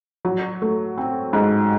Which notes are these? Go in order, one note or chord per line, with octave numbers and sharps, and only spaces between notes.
F#3
A3
C4
G#2